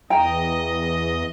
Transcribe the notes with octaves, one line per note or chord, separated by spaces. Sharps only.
E2 D#5 G5 A#5